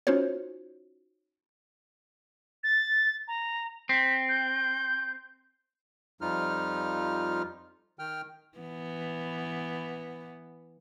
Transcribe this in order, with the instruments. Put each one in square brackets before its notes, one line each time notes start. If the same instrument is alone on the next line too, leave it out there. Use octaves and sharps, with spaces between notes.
[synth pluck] C#4 D#4 F4 F#4 C5 C#5
[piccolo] A6
A#5
[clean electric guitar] C4 [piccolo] B6
[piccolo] G6
[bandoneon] F2 F3 G3 D#4 F4 F6
D#3 G5 F6
[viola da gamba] E3 B3